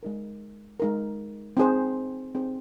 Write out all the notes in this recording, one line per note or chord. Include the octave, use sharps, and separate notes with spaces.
G#3 D#4 A#4
G#3 D#4 A#4
C4 D#4 G#4 C5
C4 D#4 G#4 C5